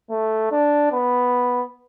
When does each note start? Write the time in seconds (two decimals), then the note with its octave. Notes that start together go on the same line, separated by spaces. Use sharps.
0.10 A3
0.51 D4
0.92 B3